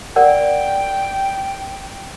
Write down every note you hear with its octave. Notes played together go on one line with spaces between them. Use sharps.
A#4 D5 F#5 G5